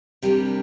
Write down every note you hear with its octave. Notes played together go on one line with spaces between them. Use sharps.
C3 G3 A#3 D4 G4